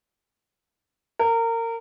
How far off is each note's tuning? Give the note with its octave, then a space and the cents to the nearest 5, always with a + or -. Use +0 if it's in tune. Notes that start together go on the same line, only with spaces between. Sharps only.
A#4 -25